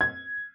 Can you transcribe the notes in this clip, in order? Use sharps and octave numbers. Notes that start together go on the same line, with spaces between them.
G#6